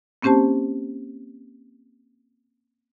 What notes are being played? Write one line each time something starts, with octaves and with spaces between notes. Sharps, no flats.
A#3 C4 C#4 G4 C5 A5